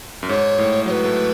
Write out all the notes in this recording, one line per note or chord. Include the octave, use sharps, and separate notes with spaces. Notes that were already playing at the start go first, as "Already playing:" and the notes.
F#2
G#2 C#5
A2
F#3 C#5
B4
A3